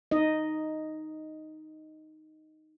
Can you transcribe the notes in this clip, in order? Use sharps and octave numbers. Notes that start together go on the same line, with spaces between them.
D#4 D#5